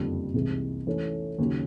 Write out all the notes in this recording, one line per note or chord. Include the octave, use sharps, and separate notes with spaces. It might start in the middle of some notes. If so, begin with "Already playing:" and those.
Already playing: F#1 F2 D3 G3
C2 C3 E3 G#3
E3 A3 C#4
D#2 C#3 F#3